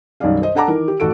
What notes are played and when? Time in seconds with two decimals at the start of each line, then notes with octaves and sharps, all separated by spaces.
0.20 B1 F#2 D#3 G3 D5 F5
0.42 C5 D#5
0.55 D4 A4 F#5 A5 A#5 D6
0.67 D#3 E3 A#4
0.88 G4
1.00 A1 F#4 A4 D7